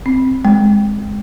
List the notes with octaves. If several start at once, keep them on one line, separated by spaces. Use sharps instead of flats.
C4
G#3